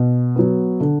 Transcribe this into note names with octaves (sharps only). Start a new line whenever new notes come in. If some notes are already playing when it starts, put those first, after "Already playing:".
Already playing: B2
F#3 B3
D3